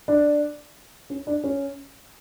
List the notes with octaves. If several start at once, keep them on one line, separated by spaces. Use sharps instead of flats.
D4
C#4
D4
C#4